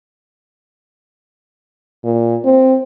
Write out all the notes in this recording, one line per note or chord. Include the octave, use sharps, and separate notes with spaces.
A#2
C4